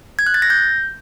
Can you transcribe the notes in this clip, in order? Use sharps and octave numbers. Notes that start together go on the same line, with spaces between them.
G#6
F#6
A6
A#6
G6